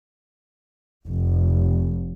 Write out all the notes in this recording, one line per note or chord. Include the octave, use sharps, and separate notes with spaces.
F1